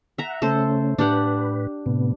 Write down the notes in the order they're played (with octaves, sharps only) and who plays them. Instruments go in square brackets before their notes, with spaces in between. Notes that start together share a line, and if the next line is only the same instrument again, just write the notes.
[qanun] E5 A#5 [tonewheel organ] F#5
[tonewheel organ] C#3 A3 C#4 [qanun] A4 C5
[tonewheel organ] A2 B4 [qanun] D4 G4 F#5
[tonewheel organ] A2 C3 B3